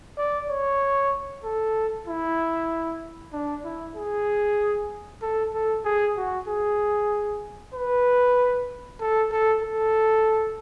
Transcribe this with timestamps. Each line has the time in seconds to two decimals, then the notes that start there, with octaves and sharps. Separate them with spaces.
0.18 D5
0.50 C#5
1.44 A4
2.07 E4
3.33 D4
3.65 E4
3.96 G#4
5.22 A4
5.54 A4
5.85 G#4
6.17 F#4
6.48 G#4
7.74 B4
9.01 A4
9.32 A4
9.63 A4